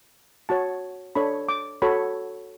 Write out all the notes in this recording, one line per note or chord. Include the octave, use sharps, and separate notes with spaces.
F#4 C#5 A5
D4 A4 C#5 B5
D6
F#4 A4 C#5 B5